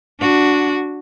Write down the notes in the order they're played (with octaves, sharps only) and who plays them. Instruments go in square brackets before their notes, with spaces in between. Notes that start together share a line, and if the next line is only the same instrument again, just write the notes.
[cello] D4 F#4